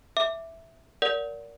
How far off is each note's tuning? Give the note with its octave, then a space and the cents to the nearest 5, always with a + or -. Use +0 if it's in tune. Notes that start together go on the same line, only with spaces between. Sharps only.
E5 +0 D6 +0
A#4 +0 D5 -30 F#5 -15